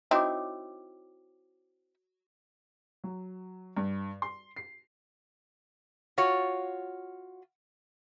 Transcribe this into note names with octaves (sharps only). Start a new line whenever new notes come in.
C4 D#4 E4 F#4 C#5 D6
F#3
G2
C6
C7
F4 F#4 C#5